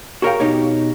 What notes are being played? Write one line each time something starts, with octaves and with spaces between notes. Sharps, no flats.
F#4 G#4 A#4 C#5 F5 G5
B2 D#4 G4 C#5